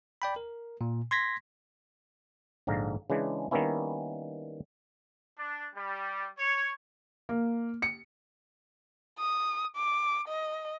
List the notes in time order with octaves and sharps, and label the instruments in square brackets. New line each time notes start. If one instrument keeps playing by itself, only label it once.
[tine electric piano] D5 G5 B5
A#4
A#2
C6 G#6 A#6 B6
[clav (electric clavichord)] A#1 G#2 D3 F5 A#5
C#3 E3 G#3 D4
D#3 G3 A#3 B3 C#4 E4
[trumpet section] D4
G3
C#5
[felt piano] A#3
C#7
[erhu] D#6
D6
D#5